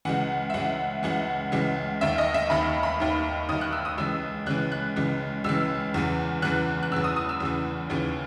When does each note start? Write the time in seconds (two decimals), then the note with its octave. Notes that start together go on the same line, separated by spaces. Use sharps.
0.05 C#2 C#3 E3 F#5
0.50 E5
0.54 C#2 C#3 E3 F#5
1.03 C#2 C#3 E3 F#5
1.52 C#2 C#3 E3
2.01 D#2 D#3 E5
2.18 D#5
2.34 E5
2.50 D#2 D#3 B5
2.83 B5
3.00 D#2 D#3
3.49 D#2 D#3 D#6
3.61 F#6
3.73 E6
3.85 D#6
3.98 C#2 C#3 E3 E6
4.46 C#2 C#3 E3 F#6
4.72 F#6
4.96 C#2 C#3 E3
5.44 C#2 C#3 E3 E6
5.94 E2 C#3 E3
6.42 E2 C#3 E3 F#6
6.83 F#6
6.92 E2 C#3 E3 E6
7.04 D#6
7.16 D#6
7.29 E6
7.40 E2 C#3 E3
7.90 D#2 C#3 E3